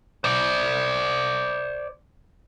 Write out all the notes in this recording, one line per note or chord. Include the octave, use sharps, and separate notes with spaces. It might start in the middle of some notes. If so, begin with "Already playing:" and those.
C5 D5